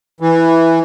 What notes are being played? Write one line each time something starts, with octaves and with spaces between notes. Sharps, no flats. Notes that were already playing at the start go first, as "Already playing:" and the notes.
E3